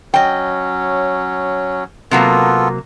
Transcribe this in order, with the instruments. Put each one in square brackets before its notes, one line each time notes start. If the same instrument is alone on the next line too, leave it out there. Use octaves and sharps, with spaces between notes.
[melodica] F#3 C#4 [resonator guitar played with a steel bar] D#5 G5
[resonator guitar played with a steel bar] C3 F#3 A#3 [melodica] B3 F4 A4